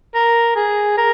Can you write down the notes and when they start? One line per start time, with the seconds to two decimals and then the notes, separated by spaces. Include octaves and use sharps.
0.14 A#4
0.56 G#4
0.97 A#4